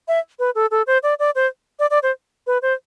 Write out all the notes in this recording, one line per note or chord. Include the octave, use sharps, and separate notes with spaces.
E5
B4
A4
A4
C5
D5
D5
C5
D5
D5
C5
B4
C5